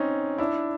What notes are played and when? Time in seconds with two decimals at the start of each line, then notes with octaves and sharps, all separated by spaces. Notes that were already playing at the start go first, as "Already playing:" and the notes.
Already playing: C4 C#4 D#4
0.38 D4 E4